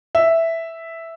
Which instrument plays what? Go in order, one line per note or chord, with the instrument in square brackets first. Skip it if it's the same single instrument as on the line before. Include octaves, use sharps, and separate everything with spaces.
[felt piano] E5